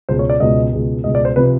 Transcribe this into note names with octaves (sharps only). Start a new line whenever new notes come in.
C#2 B2 G#3 C5
C#5
D5
C#2 B2 G#3 D#5
C#2 B2 G#3
C#2 B2 G#3 D#5
D5
C5
C3 F3 B4